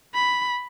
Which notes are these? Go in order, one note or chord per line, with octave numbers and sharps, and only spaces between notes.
B5